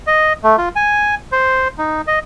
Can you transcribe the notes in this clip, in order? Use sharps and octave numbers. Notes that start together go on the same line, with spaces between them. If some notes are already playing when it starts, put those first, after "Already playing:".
D#5
A3
F4
G#5
C5
D#4
D#5